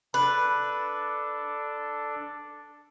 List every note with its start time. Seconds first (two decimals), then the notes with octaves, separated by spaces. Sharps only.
0.14 D4 A4 B4 B5